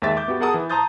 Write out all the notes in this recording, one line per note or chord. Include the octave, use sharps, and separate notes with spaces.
D#2 G#3 E5 A6
E5 D6 G6
B3 F#4 G4
G#4 A#4 F#5 A5 D#6 E6
E3
A5 A#5 C6 D#6 G6 A6